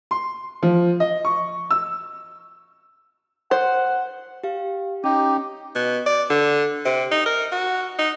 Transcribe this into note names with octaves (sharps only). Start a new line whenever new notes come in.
C6
F3
D#5
C#6
E6
C5 F#5
G4 F5
C#4 D#4 G4
B2
D5
D3
C3
D#4
A#4
F#4
D#4